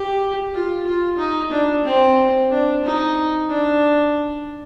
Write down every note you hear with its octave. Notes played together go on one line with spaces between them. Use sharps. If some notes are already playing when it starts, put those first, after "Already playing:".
Already playing: G4
F4
F4
D#4
D4
C4
D4
D#4
D4